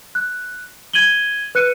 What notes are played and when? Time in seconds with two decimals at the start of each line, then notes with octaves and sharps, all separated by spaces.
0.15 F#6
0.93 G#6 D#7 F#7 G7
1.55 B4 F#6 C#7 D#7